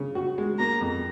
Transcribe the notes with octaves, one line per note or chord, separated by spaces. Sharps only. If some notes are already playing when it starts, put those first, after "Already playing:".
Already playing: C#3
F#4
G#3
A#3 A#5
F2